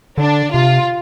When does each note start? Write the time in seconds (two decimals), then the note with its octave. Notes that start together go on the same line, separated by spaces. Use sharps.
0.18 D3 D4
0.53 C3 F4